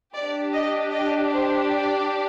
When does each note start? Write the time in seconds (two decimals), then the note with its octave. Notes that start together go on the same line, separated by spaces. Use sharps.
0.14 D4 G4 D5
0.53 D#5
0.92 D#5
1.32 C5
1.72 D5